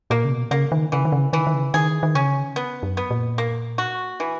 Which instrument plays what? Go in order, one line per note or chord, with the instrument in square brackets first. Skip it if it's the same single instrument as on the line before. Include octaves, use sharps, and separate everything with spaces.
[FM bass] A#2 [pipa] A#3
[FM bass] C#3
B2
[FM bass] C#3 [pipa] A#3
[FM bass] D#3
[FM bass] C#3 [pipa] E3
[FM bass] D#3
C#3
[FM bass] D#3 [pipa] E3
[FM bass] D#3
C#3
[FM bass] D#3 [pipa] G#4
[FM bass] D#3
[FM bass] C#3 [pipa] C#4
[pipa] B3
[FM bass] F#2
[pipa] B3
[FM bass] A#2
[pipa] A#3
F#4
E3